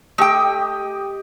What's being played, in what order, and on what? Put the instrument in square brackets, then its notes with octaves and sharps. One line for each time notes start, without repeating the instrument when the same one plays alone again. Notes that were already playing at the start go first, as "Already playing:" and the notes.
[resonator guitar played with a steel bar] A3 G5 [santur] G4 D#5